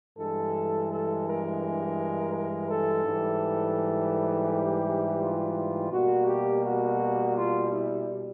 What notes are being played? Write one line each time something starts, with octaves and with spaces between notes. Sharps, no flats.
G2 E3 G#3 A4
A4
A#4
A#4
A4
G#2 E3 G3
G4
F4
B2 G3 A#3 F#4
G4
F#4
F4
E4